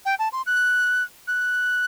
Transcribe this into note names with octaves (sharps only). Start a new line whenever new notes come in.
G5
A5
C6
F#6
F#6